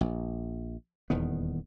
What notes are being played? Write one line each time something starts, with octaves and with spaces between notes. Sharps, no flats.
A#1
D#1 E2 D#3 B3